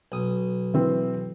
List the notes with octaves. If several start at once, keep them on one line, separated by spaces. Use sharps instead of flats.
B1 D#6
E3 C4 B4